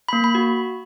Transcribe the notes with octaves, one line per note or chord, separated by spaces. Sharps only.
A#3 B5
B5
F#4